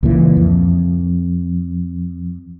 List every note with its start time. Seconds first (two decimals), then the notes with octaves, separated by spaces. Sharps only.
0.03 C#2 A#2 E3
0.37 F2